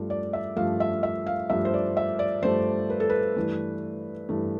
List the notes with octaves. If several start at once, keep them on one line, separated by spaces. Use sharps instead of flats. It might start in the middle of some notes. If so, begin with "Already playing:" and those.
Already playing: G2 F3 A3
D5
E5
G2 F3 A3 F5
E5
E5
F5
G2 F3 A3 E5
C5
D5
E5
D5
G2 F3 A3 C5
B4
A4
B4
G2 E3 A3
G2 E3 A3